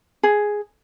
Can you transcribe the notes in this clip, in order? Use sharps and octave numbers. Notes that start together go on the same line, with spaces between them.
G#4